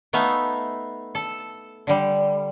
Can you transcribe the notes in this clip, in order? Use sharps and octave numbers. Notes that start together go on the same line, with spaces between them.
A3 B3 D#4 E5 F5
A4
D3 G3